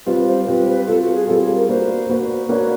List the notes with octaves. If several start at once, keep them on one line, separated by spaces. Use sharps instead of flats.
G3 C4 F4 B4
C5
G3 C4 F4 B4
B4
G3 C4 F4 A4
F#4
G#4
G3 C4 F4 A4
G#4
A#4
A#3 D4 F#4 B4 C5
A#3 D4 F#4 B4
A#3 D4 F#4 B4 C#5